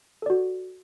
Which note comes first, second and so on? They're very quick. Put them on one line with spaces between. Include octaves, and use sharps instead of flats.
A4 D5 F#4